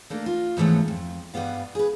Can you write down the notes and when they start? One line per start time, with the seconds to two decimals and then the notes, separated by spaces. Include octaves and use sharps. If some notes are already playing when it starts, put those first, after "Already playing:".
0.10 A3 A#3 D4
0.26 F4
0.57 G#2 E3 F3 A3 B3 C#4
0.88 F2
1.34 G2 C#3 G3 B3 F5
1.75 G#4 B4